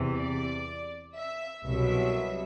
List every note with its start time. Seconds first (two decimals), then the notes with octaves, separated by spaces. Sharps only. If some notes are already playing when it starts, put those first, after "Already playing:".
Already playing: E2 C3 E3
0.17 D5
1.16 E5
1.63 C2 B2 F#3 E5